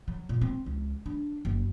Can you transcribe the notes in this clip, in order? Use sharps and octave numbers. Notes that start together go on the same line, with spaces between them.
F#3
A#2
C4
C#2
D4
F#1